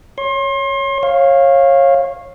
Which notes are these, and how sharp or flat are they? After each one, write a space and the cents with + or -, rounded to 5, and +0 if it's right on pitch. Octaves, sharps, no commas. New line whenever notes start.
C#5 +0 C6 +35
C#5 -25 F5 +0